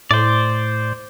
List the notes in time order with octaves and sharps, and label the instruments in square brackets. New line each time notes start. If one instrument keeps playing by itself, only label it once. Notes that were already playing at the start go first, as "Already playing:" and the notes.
[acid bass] A2 [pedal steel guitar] C5 D5